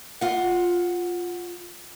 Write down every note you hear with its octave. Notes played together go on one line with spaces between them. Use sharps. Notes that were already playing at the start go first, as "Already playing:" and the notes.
F4 F#5